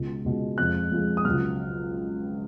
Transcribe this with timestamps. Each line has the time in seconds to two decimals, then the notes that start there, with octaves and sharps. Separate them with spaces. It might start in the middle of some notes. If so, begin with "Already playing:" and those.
Already playing: C#2 B2 G#3
0.24 C#2 B2 G#3
0.58 F2 F3 G#3 F#6
0.92 F2 F3 G#3
1.17 D#6
1.25 C#2 B2 F#3 F6